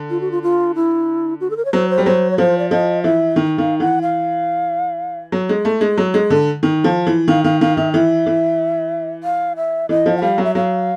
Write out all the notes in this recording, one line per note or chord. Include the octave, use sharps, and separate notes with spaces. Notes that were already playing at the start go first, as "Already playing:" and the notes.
Already playing: D3
F4
F#4
F4
F4
E4
F#4
A4
A#4
C#5
F#3 C5
C5
G3
F#3 C5
C#5
F3 C5
D5
F3 D#5
E3 E5
D#3
D#3 F5
E3 F#5
F5
F#3
G#3
A3
G#3
F#3
G#3
D3
D#3
F3
E3
D#3 F5
D#3 F5
D#3 F5
D#3 E5
E3 E5
E3
F5
E5
E3 D#5
F3
F#5
G3 F5
F#3
E5
F#3 F5